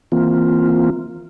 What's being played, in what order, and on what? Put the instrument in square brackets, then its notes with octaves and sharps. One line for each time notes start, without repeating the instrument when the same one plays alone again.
[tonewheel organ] E3 A#3 C4 F4